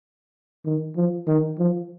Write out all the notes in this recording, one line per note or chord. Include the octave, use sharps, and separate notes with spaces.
D#3
F3
D#3
F3